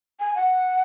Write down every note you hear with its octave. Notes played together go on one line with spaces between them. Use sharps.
G#5
F#5